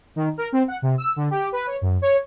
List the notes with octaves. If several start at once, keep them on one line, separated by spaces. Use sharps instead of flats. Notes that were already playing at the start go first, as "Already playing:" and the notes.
D#3
A#4
C4
F#5
C3
E6
D3
G4
B4
C#5
F#2
C#5